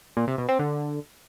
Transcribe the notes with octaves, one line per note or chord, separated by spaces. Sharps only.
A#2
C3
B2
C4
D3